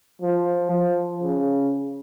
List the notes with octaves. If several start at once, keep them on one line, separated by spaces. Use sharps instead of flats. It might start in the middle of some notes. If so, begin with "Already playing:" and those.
F3
F3
C#3